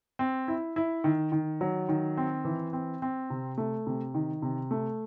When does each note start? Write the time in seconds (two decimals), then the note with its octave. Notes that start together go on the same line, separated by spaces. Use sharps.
0.19 C4
0.48 E4
0.76 E4
1.04 D#3
1.32 D#3
1.61 F#3
1.89 D#3
2.17 C4
2.45 E3
2.73 C4
3.02 C4
3.30 C3
3.58 A3
3.87 C3
4.14 D#3
4.42 C3
4.71 A3